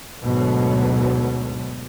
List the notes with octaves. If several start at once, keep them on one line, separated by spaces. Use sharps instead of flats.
D2 G#2 B2 D3 F#3